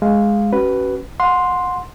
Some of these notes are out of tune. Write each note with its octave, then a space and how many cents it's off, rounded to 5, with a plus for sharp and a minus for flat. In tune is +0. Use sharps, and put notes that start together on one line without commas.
G#3 +0 F5 +0
C#4 +0 F#4 +40 B4 +0
F#5 -30 C6 +0